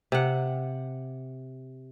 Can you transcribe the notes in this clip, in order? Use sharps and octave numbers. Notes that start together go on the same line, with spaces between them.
C3 F#5